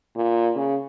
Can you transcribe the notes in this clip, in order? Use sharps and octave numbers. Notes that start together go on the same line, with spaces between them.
A#2
C#3